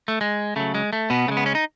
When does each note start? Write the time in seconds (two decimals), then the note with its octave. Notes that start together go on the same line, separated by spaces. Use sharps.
0.08 A3
0.21 G#3
0.56 C#3 F#3 A3
0.75 G#3
0.93 A3
1.10 B2 B3
1.28 C#3 A3
1.31 G#3
1.37 B3
1.46 C#4
1.55 D#4